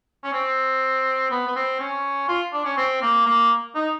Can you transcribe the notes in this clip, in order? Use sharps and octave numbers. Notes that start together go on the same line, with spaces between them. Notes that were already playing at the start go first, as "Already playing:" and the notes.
C#4
C4
B3
B3
C4
C#4
F4
D4
C#4
C4
A#3
A#3
D#4